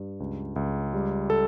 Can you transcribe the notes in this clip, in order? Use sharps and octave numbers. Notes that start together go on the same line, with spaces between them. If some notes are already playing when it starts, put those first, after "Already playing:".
Already playing: G2
C#2
C#2
G3
A4